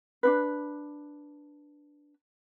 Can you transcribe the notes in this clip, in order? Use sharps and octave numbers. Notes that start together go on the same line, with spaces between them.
D4 D#4 B4